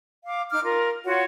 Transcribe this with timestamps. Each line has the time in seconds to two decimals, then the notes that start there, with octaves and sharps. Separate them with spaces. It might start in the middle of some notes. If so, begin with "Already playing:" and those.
0.24 F5 D6
0.50 D#4 D6 F6
0.63 F4 A#4
1.05 F4 F#4 C#5 F#5